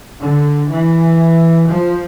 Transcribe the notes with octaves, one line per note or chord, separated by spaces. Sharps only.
D3
E3
F3